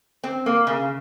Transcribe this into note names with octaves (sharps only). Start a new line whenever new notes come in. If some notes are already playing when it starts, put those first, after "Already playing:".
C4
A#3
C#3